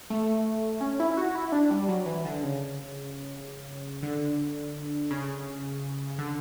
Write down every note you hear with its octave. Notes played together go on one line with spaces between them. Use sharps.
A3
C#4
E4
F#4
E4
D4
G3
F#3
E3
D3
C#3
D3
C#3
D3